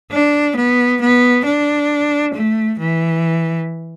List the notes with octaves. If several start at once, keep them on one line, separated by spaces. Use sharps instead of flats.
D4
B3
B3
D4
A3
E3